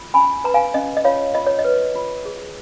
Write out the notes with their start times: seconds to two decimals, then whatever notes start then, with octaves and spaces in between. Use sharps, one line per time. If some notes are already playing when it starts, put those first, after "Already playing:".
Already playing: F4
0.14 C#4 G#5 B5
0.44 B4 A#5
0.54 F5 G#5
0.74 C#4 D#5
0.97 D#5
1.04 F4 C#5 F5
1.34 F4 D#5
1.47 C#5
1.59 D#5
1.64 B4
1.95 F4
2.25 G#4